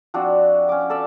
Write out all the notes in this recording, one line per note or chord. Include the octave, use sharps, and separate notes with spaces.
F3 C4 D4 F#4
C#4 D6
A4 D5 E5 A5